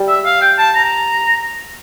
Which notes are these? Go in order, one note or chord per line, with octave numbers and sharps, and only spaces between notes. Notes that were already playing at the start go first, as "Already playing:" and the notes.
Already playing: G3
E5
F5
G5
A5
A#5